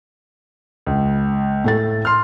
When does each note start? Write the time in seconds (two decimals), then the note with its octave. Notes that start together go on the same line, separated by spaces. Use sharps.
0.86 C#2
1.64 A2 A3 A6
2.05 C6 F6